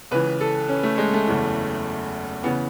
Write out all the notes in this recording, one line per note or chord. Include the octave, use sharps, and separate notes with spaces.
C#2 C#3 E3 B4
A4
C#4
A3
G#3
A3
F#1 E2 C#3 E3
C#3 E3 B3